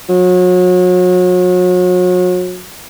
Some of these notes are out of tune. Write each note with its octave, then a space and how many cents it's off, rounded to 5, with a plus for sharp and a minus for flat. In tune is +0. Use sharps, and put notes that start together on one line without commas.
F#3 -35